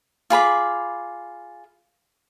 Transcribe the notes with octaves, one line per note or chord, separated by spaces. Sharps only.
F4 G#4 B5 D6